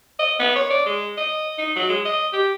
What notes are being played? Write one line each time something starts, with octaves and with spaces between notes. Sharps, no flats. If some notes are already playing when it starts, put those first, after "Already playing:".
D#5
B3
C#5
D5
G#3
D#5
D#4
F#3
G#3
D#5
G4